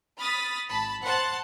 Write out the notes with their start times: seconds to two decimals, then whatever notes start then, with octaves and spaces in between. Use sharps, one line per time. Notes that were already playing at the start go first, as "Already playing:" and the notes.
0.20 B5 D#6 F6 A6 B6
0.70 G#1 A5 B5
1.03 C5 F#5 A5 C6 F#6 A6